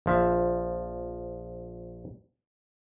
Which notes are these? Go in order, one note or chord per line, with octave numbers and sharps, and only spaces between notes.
A#1 F3 E5